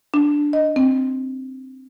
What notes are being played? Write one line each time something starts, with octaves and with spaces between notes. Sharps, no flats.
D4
D#5
C4